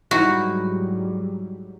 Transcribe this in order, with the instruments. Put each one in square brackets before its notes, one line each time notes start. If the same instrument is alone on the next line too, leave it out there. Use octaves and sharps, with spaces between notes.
[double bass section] G#2 F#3 G3 [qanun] D#4 E4 B4 [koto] F#4